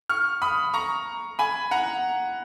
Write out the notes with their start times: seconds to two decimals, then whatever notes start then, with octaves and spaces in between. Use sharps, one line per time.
0.09 C#6 F6
0.42 B5 D#6
0.74 A#5 C#6
1.39 G#5 B5
1.71 F#5 A#5